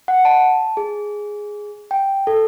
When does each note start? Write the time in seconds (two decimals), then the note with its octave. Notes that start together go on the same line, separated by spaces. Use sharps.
0.08 F#5
0.25 A5
0.77 G#4
1.91 G5
2.27 A4